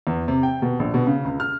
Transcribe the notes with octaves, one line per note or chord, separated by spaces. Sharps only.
E2
C3
G5
B2
A#1
B2
C#3
C#2
F6